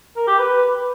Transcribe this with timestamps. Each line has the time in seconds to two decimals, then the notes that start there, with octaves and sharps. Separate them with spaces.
0.16 A#4
0.28 G4
0.39 B4